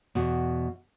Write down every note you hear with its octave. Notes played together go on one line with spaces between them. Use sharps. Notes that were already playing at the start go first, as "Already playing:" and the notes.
E2 B2